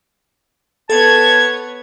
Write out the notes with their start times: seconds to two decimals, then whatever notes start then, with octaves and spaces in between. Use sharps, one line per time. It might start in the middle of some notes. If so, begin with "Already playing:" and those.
0.90 B3 A4 C#5 A5 G#6